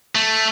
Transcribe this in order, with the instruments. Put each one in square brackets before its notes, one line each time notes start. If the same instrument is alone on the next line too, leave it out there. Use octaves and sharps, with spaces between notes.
[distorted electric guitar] A3